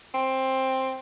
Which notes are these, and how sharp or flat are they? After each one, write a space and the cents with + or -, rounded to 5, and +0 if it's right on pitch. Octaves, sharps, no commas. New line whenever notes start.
C4 +10